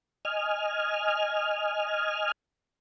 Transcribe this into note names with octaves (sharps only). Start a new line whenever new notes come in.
D#5 G#5 F6